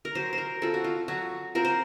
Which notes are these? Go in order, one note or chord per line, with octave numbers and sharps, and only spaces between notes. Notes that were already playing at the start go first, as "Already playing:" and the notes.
A#4
F#3 C5
C5
A#4
C4 F4 A4
F#4
F4
F#3 F#4
C4 F4 A#4
C5